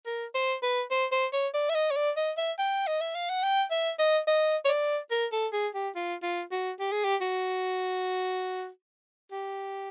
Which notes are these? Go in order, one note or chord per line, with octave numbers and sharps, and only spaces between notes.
A#4
C5
B4
C5
C5
C#5
D5
E5
D#5
C#5
D5
D#5
E5
G5
D#5
E5
F5
F#5
G5
E5
D#5
D#5
C#5
D5
A#4
A4
G#4
G4
F4
F4
F#4
G4
G#4
G4
F#4
G4